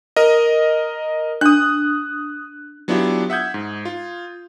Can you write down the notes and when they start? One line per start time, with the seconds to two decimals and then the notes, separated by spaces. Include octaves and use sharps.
0.16 A#4 D#5
1.41 D4 D#6 F#6
2.88 F#3 B3 D4 E4 F4 G4
3.30 E5 F#5 D#6 G6 G#6
3.54 G#2
3.85 F4